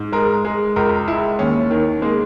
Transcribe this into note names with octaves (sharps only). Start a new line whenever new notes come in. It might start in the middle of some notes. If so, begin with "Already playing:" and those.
Already playing: G#2
G#3 A#4
G#3
C#2 A#4
G#3 E4
D#2 C#4
D#3
G#3 A#3